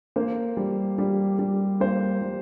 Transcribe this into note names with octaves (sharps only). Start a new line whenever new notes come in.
A#3 C5
G3
G3
G3
A#3 C5
G3